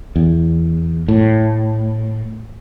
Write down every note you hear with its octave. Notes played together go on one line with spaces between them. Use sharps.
E2
A2